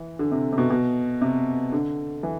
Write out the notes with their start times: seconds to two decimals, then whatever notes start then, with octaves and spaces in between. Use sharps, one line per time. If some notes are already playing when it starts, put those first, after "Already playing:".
Already playing: E3
0.19 D3
0.32 C3
0.53 C3
0.58 B2
0.70 B2
1.22 C3
1.72 D3
2.23 E3